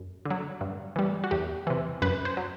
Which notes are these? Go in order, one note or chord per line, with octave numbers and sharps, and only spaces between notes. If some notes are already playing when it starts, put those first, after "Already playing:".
Already playing: F#2
D3 F#3
G2
E3 G3
F#4
E2 G4
C3 E3
F#2 B4
C5
F#3